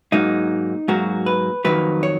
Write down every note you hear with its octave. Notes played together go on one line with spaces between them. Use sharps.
G#2 F#3 A#3 D#4
G#2 F#3 A#3 F#4
B4
F2 D#3 F#3 A#3 B4
C#5